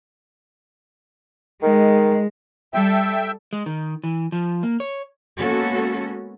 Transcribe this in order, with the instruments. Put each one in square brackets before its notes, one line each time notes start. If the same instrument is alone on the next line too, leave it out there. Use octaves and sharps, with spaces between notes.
[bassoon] D#3 [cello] G#3
[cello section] G3 A4 [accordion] E5 G5 E6
[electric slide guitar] G#3
D#3
E3
F3
A#3
C#5
[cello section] G#3 A#3 B3 C#4 F#4 A4